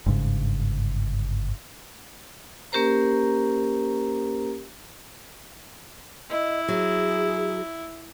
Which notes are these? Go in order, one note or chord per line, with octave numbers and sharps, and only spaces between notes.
G1 G#2 C#3
A#3 C#4 G4 A#4 C5 A#5
E4 D#5
F#3 G#4